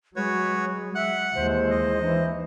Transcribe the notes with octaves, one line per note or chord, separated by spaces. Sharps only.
F#3 G#3 F#4 B4 C#5
E5 F#5 F#6
D#2 E3 G#3 C5
D#5
E3 D#4